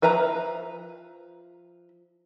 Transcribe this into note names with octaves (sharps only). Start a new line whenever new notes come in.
F3 B4 E5 A#5